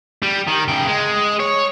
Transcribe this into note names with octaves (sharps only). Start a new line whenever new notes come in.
G3
D#3
C#3 G5
G#3
C#5